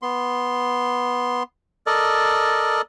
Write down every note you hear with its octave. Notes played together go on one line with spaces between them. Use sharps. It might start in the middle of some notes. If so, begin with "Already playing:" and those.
B3 C6
A4 A#4 D5 D#5